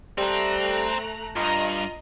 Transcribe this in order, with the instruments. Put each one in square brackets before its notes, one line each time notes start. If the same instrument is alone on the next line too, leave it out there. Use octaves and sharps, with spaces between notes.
[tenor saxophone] G3 [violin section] A3 A#5 F#6 [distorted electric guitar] C4
[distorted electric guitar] G2 [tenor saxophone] F4 [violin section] D#5 A#5